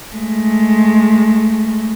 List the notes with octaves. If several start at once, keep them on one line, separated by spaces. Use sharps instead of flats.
G#3 A3